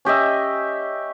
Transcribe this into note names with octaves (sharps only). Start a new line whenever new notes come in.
C#4 G4 D#5 E5